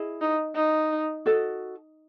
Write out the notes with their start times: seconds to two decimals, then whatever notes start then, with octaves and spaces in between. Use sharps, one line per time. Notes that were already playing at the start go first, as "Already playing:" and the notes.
Already playing: E4 G#4 D#5
0.21 D#4
0.55 D#4
1.26 F#4 A4 D#5